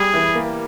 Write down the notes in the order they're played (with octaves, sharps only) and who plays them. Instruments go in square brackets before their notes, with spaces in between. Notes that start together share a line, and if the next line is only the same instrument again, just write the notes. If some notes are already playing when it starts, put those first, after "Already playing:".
Already playing: [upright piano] G3 [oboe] G#4
[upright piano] E3
A#3